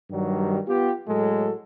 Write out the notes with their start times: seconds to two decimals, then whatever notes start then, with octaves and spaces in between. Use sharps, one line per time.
0.11 G2 D#3 F#3 G3
0.67 B3 F4 G4
1.08 A2 F#3 G#3 A4